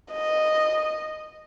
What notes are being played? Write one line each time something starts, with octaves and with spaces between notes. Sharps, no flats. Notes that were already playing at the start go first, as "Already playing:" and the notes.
D#5